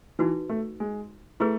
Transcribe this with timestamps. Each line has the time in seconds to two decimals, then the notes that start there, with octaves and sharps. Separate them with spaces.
0.19 E3 D#4 F#4 B4
0.49 A3
0.80 G#3
1.40 A3 E4 G#4 B4